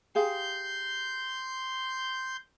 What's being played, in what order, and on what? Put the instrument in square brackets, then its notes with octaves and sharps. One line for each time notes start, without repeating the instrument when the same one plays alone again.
[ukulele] G4 G#4 F5 [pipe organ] C6 G6